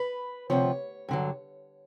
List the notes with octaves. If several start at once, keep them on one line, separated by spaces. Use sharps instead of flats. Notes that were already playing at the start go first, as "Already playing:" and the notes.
Already playing: B4
D2 C3 F3 C#5
G2 D3 F#3